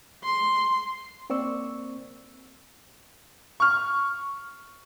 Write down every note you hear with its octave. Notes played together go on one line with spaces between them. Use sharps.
C6
A#3 C4 D5 C#6 E6
C#6 F6